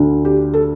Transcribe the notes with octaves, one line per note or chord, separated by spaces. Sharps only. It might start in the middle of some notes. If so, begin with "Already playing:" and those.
Already playing: D2 D3
G4
A4